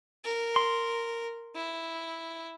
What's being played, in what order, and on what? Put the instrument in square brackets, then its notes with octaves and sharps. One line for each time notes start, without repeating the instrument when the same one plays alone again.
[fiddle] A#4
[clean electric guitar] C6
[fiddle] E4